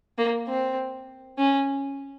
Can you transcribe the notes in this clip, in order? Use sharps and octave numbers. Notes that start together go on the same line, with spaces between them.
A#3
C4
C#4